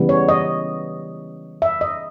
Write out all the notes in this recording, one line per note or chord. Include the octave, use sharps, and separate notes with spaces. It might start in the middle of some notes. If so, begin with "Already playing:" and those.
Already playing: C#3 E3 G3 B3
C#5
D#5
E5
D#5